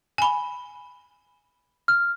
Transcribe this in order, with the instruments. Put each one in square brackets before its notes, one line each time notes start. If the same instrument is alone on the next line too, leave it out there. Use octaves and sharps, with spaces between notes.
[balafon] G#5 B5
[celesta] F6